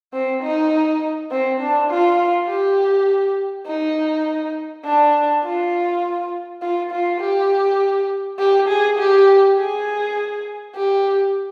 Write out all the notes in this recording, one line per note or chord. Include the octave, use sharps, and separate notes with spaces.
C4
D#4
C4
D4
F4
G4
D#4
D4
F4
F4
F4
G4
G4
G#4
G4
G#4
G4